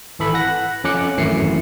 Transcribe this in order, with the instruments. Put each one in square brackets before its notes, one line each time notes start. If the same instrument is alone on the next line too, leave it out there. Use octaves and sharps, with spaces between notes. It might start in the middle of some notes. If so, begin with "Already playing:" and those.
[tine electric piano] G#1 E3 A4 B5
F#5 F#6 A#6
F2 C#4 D6 F#6 C#7
G#1 F#2 E3 A3 C7 C#7